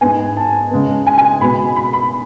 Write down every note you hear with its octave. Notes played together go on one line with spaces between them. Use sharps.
G#2 G#3 B3 G#5
A5
C#3 G#3 B3
G#5
G#5
B2 G#3 B3 B5
B5
B5